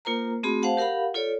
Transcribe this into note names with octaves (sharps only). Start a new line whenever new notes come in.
A#3 F4 A#4 C5 A#5
A3 C4 F#4 G#4 B5
C5 F5 F#5 A5
G4 A#4 F5 F#5 B5
F4 A4 C#5 D5